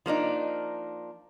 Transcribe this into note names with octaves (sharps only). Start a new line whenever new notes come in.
F3 A#3 D4 D#4